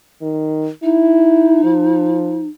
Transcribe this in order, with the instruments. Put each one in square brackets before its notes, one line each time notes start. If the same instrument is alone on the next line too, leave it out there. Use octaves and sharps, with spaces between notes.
[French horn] D#3
[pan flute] D#4 [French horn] E4
[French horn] F3